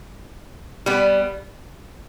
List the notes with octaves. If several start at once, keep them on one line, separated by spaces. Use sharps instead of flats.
G3 B3